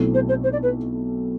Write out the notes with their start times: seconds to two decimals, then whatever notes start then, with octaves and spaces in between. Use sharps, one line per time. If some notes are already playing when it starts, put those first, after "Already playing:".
Already playing: B1 B2 A3 C4 E4
0.14 C5
0.28 C5
0.43 C5
0.52 D5
0.62 B4